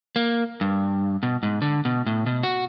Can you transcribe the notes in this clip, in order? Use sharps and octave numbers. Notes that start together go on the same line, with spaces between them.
A#3
G2
B2
G#2
D3
B2
A2
B2
F#4